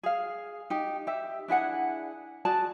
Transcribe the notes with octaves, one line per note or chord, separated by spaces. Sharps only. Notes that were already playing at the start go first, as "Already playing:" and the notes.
G#4 F5
D#4 G4
G4 E5
D4 E4 G#4 F#5
F#4 G#4 D5 A5